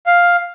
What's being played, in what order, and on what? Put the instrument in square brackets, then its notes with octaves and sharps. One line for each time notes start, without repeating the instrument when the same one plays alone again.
[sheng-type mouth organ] F5